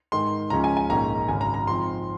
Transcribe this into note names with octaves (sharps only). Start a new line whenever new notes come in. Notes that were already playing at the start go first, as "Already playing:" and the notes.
G#2 D#3 G#3 C6
C#2 C#3 F3 G#3 C#4 A#5
G#5
G#5
A#1 G#2 D#3 G#3 C#4 A#5
G#1 F#2 C#3 G#5
A#5
A#5
G#2 F3 C4 C6